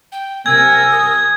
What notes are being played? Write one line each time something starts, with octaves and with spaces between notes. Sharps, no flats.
G5
C3 A#4 G#5 E6 G#6
D#6